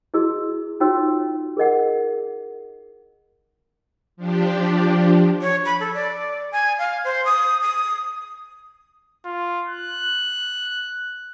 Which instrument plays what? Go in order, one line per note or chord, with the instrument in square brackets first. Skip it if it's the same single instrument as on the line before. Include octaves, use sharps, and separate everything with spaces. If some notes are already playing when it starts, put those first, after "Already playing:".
[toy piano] E4 F#4 G#4 D#5 E6
D#4 F4 F#4 C#5 G5 E6
G#4 A#4 D#5 F#5
[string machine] F3 D4 G4
[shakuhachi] C#5
B5
A4
D5
G#5
F5
C5
D#6
D#6
[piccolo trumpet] F4
F#6